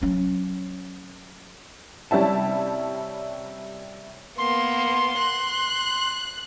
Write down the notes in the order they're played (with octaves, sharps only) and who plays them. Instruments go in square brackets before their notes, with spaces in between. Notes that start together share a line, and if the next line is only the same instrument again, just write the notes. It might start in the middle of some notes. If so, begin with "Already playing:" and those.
[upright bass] F#3 C#4
[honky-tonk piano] C3 G3 C#4 E4 A5
[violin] A#3 B3 [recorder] C6
[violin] F#6